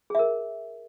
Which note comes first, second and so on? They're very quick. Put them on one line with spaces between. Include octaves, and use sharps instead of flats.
G#4 E5 A#4